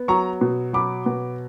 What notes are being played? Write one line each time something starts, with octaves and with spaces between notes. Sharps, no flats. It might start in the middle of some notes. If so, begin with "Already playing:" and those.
Already playing: B3
F#3 A#5 C#6
B2
F#3 B5 D6
B2